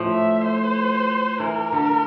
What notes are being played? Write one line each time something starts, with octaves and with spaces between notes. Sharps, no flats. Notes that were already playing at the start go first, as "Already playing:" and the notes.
Already playing: A2 F3 A3
E5
C5
E3 A#4
D3